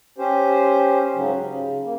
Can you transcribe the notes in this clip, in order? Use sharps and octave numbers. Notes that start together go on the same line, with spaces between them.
C#4 G4 C5
G#2 C#3 F#3
C#3
A#3